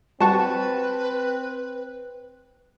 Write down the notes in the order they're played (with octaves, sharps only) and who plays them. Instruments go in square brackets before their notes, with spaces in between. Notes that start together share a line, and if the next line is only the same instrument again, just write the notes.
[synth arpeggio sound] G3 F#4 C#6 [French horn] C4 [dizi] B4 [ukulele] A5